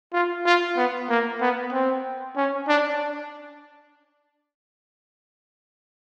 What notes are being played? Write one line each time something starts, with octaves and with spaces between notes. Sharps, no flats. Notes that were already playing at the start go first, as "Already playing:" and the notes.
F4
F4
B3
A#3
B3
C4
C#4
D4